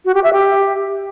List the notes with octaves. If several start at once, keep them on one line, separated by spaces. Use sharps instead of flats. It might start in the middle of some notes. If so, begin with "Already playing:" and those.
F#4
G4
E5
G4